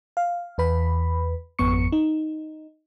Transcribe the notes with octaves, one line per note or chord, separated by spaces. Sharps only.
F5
E2 B4 B5
G#1 F2 B3 C#6 C#7
D#4